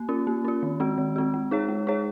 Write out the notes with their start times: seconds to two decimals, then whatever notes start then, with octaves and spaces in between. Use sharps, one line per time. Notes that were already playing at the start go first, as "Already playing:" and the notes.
Already playing: A#3
0.09 C#4 F4
0.27 A#3
0.45 C#4 F4
0.63 D#3
0.80 G#3 C4 F#4
0.98 D#3
1.16 G#3 C4 F#4
1.34 G#3
1.51 D#4 G#4 C#5
1.68 G#3
1.87 D#4 G#4 C#5